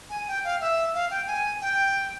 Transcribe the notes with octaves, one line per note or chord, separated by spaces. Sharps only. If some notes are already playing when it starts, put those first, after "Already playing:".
G#5
G5
F5
E5
F5
G5
G#5
G5